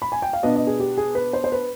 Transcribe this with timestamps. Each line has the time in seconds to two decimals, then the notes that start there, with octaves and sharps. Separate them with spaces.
0.02 B5
0.12 G#5
0.22 G5
0.33 F5
0.43 B2 B3 D4 D#5
0.56 D#5
0.67 G#4
0.80 G4
0.98 G#4
1.15 B4
1.33 C5
1.44 C5
1.52 B4